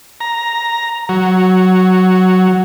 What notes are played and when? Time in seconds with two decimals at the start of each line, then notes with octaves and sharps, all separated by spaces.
0.21 A#5
1.09 F#3